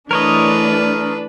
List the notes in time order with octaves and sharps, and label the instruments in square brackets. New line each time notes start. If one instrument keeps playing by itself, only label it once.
[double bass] E3 A3 [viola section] D4 [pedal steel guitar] A#4 C#5 D#5 [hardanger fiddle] B4